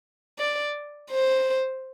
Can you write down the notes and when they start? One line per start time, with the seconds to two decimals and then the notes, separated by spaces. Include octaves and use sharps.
0.39 D5
1.11 C5